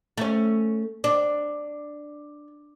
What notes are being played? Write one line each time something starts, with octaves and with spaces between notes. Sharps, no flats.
A3 C#4
D4